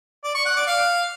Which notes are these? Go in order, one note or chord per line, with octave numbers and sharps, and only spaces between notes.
D5
C#6
F#5
D5
F5